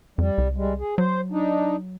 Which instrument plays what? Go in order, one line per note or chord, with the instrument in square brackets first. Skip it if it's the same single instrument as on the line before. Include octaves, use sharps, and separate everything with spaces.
[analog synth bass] F2 [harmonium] G3
[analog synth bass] C2
[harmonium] G3 G#3
G#4
[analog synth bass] F#3 [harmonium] C5
[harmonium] D4 D#4